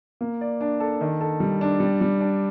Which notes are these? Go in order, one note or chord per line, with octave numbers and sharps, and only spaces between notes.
A#3
D5
D4
A4
D#3
A4
G3
D4
G3
G3
D4